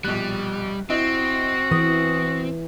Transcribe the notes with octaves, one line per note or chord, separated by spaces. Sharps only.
A#1 B2 G3 F#6
C4 E4 F#4 D#5
E3 D#6